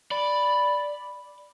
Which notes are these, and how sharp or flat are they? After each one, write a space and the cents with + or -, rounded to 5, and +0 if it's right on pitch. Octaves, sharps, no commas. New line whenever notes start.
D5 +0 B5 +0